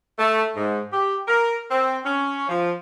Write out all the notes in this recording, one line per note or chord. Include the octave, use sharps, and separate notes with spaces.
A3
G#2
G4
A#4
C4
C#4
F3